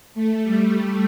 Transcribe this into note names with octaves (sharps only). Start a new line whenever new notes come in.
A3
G3
G3